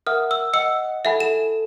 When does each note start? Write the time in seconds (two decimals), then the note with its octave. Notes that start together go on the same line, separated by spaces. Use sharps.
0.07 A#4 E5 F#5 D#6 F6
0.31 E6
0.53 D#5 F#5 E6 C#7
1.05 E4 A4 E5 F#5 G#5 B5
1.20 A4 E7